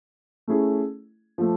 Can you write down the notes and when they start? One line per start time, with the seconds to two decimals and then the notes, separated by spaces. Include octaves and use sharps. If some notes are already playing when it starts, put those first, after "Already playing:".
0.48 A3 C#4 E4 G#4
1.38 F3 A3